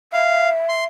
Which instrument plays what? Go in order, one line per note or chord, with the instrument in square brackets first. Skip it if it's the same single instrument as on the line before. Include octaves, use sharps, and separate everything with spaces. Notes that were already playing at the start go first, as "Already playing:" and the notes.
[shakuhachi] E5 [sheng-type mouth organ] F5
[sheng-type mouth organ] C6